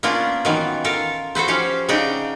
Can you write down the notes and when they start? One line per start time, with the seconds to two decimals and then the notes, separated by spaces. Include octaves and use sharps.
0.03 A#3 B3 C#4 D4 F4
0.45 D#3 E3 F#3 B3 F4
0.84 F4 A4 A#4 F5
1.35 F#4 A4 B4 C5
1.48 F3 C#4 G4 F5
1.89 C#3 D4 D#4 F#5 G5